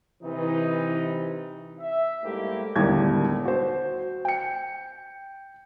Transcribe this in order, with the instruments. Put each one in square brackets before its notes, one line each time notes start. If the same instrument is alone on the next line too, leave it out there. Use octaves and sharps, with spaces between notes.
[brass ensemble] C3 E3 D#4
E5
G#2 G3 A3 A#3 E4 G4
[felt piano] E1 D#2 A2 D3 G3 G#6
F#4 C5
G5 C#7